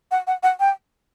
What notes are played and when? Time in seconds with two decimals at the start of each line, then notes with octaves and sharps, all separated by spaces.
0.11 F#5
0.27 F#5
0.43 F#5
0.60 G5